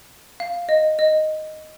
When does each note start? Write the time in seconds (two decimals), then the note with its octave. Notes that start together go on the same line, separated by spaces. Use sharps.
0.40 F5
0.69 D#5
0.99 D#5